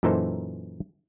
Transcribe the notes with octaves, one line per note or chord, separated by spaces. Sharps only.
F#2 A#2 E3 D#4 A4 C5